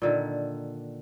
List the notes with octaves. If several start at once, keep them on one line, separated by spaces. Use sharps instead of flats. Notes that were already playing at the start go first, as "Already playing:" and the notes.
A#2 D3 D#3